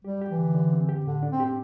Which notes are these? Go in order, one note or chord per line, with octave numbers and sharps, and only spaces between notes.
G3 G4
G4
E3
D3
D3
C4
G4
A2 D3
D4
C4
G4
C4